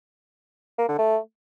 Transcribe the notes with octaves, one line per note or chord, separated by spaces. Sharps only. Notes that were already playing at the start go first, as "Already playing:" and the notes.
A#3
D3
A3